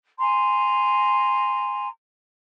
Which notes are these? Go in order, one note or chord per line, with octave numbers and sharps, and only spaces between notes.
G#5 A#5 C6